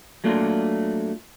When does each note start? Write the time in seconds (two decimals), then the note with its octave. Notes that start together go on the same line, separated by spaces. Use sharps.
0.24 F#3 A3 A#3 D4 F4